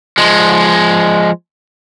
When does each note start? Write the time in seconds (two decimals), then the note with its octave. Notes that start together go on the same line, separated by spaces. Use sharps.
0.18 F3 G#3